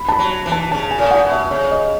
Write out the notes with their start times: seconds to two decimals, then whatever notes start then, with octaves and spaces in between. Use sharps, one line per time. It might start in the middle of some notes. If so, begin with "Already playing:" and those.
Already playing: B5
0.08 A5
0.12 B5
0.19 F#3
0.46 E3
0.52 A5
0.71 C#3 A5
0.91 G#5
0.98 A2
1.11 F#5
1.25 B2
1.31 E5
1.51 C#3 C#5
1.71 D#5